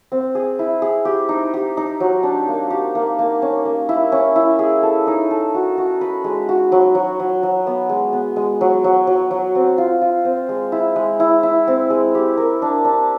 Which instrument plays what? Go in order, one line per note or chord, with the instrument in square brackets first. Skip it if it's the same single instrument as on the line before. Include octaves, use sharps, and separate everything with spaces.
[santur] C4
G#4
E4
G#4
G4
D#4
G4
D#4
F#3
D4
A#3
G4
A#3
A#3
C#4
A#3
E4
C#4
E4
G#4
A4
D#4
A4
F#4
F#4
B4
G#3
F#4
F#3
F#3
F#3
F#3
B3
G#3
B3
G#3
F#3
F#3
F#3
F#3
C4
F4
F4
C4
G#3
E4
G#3
E4
E4
C4
G#3
G4
A#4
D4
D4